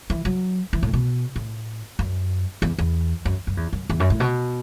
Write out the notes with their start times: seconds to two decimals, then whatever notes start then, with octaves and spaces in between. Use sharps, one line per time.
0.10 E3
0.25 F#3
0.73 E3
0.83 A2
0.93 B2
1.36 A2
1.99 F#2
2.62 E2
2.78 E2
3.25 F#2
3.47 F#2
3.57 E2
3.73 F#2
3.90 E2
4.00 F#2
4.10 A2
4.20 B2